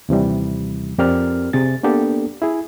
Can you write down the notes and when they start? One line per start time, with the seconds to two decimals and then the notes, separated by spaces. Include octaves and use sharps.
0.09 D#2 C3 E3 G3
0.98 F2 C4 G4 A#4 D5 F6
1.53 C3 G#4 A6
1.83 A#3 B3 D4 G4 A4
2.42 E4 G#4